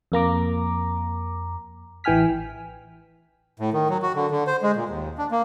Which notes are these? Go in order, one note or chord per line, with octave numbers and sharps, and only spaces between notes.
F2 A#3 A#5 D6
A1 E3 G5 G#5 F6 B6
A2
D#3
F#3
F#4
D3
D3
C5
G#3
A#2
D#2
D4
A#3